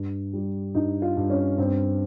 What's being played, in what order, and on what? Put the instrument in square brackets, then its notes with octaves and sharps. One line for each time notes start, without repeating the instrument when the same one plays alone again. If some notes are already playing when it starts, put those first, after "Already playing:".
Already playing: [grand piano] G2
G3
G2 D#4
F4
G2
C#4
G2 C4